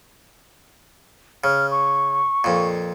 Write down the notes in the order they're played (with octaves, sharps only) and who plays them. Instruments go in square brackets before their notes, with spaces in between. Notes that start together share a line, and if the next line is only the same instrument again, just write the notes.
[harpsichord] C#3 [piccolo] F6
[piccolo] C#6
[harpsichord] F2 A#2